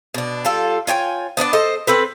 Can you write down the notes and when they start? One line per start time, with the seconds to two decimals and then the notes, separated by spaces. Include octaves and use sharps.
0.14 B2 D4
0.45 G3 F4 A4
0.87 F4 C#5 G5 G#5
1.37 B3 D4 C#5 D5
1.53 A4 C5 D#5
1.87 C4 A4 B4